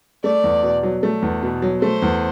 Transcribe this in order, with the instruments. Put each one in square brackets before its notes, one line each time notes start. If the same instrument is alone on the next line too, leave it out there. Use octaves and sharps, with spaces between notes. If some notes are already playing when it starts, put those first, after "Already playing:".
[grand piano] A3 [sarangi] D5
[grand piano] E2
B2
F#3
A3
E2
B2
F#3
[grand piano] A3 [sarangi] C5
[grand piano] E2